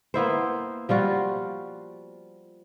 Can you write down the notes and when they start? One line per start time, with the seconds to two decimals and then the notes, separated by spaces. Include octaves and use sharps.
0.14 A#3 B3 E4 C5
0.89 F3 G3 F4 F#4